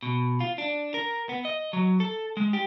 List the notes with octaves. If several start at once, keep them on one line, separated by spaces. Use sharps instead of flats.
B2
F4
D4
A#4
B3
D#5
F#3
A4
G#3
G4